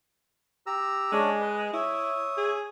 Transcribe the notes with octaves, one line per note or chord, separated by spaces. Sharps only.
G4 A#5 E6
G#3 C#4 D4
B4 D#5
E4 C#5 E5 D#6
G#4